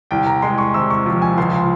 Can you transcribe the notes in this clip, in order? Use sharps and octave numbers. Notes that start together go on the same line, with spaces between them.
C2 G5
A#5
G#3 C6
C#6
C3 E6
C#6
F3
G#5
C#2 C6